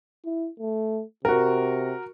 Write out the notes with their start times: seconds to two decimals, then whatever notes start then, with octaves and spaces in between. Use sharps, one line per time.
0.25 E4
0.60 A3
1.25 C3 F#4 A#4